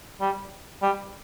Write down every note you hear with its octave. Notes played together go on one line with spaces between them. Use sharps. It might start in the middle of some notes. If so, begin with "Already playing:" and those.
G3
G3